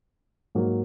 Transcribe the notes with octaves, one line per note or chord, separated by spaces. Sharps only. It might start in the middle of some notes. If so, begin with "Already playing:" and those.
G#2 F#3 A#3